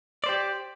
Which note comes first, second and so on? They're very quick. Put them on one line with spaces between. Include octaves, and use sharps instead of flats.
D5 C5 G4